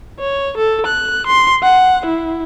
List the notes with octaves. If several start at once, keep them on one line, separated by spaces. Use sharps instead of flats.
C#5
A4
F#6
C6
F#5
E4